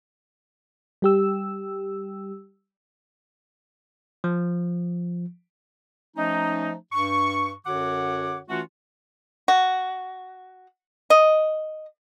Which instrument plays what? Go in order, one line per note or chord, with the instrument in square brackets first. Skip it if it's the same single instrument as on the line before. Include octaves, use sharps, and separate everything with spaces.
[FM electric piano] G3 G4 E6
[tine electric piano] F3
[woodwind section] F3 A3 C#4 D#4
G2 C#6
F#2 D3 F#4 C#5 F#5 D6
E3 A3 C#4 F4 F#4
[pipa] F#4
D#5